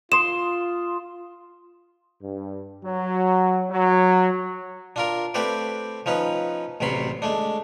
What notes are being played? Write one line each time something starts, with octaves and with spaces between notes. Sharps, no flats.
F4 C6 D#6 E7
G2
F#3
F#3
D4 F4 A#4
A3 C4 G4 B4 C5 D5
F3 C#4 D#4 B4
A1 E2 C3 F#3 B5 C6
G#3 A3 D4